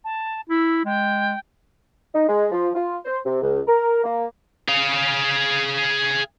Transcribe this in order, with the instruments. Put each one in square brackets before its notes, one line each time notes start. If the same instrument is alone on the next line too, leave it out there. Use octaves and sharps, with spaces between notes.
[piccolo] A5
[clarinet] E4 [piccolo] E6
[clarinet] G#3 [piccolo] G5
[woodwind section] D#4
G#3
F3
F4
C5
C3
C#2
A#4
A#3
[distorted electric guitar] G#4 F5